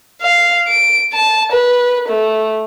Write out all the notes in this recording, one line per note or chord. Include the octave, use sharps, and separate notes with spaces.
F5
D7
A5
B4
A3